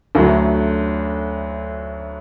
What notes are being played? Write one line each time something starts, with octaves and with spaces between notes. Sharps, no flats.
D2 D3 F#3 A3